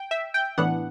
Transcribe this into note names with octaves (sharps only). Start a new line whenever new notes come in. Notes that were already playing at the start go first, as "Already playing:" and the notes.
Already playing: G5
E5
G5
A2 E3 B3 D4 F#5